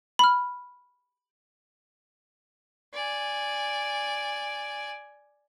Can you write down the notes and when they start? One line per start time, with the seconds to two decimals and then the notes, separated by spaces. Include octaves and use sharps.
0.19 B5 F6
2.94 D5 G#5